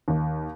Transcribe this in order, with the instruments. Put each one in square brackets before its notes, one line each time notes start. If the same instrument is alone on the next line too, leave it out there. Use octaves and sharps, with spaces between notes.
[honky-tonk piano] D#2